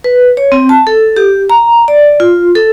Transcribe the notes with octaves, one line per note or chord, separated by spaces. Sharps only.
B4
C#5
C4
A5
A4
G4
A#5
D5
F4
A4